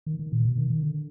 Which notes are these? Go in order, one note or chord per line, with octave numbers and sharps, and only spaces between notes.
D#3
D#3
A#2
B2
D#3
D#3
D3